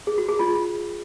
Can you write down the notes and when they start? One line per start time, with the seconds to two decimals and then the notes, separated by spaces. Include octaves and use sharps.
0.07 G#4
0.18 F#4
0.29 G#4
0.39 F4